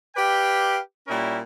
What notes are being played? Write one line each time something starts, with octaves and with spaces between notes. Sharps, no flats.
G4 B4 D5 F5 G5
A#2 G3 C#4 E4 A#4